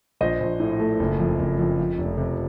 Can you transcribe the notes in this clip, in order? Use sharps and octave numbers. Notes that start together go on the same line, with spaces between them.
A#1 C5 D#5
A#1
A2
A3
F#1
F2
F#1
F2
F3
F1
C3